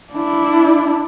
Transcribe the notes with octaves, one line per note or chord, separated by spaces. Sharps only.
D4 E4